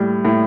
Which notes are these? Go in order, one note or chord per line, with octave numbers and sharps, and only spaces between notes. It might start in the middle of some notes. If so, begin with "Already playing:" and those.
Already playing: A2 G3
A2